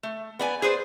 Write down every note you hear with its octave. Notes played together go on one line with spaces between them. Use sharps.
A3
B3 D5 G#5
G#4 B4 C5 D5